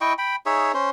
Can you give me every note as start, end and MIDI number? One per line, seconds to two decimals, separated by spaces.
0.01 0.13 64
0.01 0.13 75
0.01 0.13 79
0.01 0.13 85
0.18 0.36 79
0.18 0.36 83
0.46 0.72 63
0.46 0.72 68
0.46 0.72 73
0.46 0.72 76
0.74 0.90 61
0.74 0.90 72